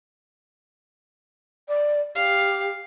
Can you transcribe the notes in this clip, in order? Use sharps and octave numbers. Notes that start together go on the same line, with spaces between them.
D5
G4 F5